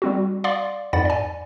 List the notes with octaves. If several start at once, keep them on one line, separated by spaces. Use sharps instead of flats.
G3 C4 F#4
D5 F5 F#5 C6 D6
F2 G#2 D5 F#5 B5 A6
D5 G#5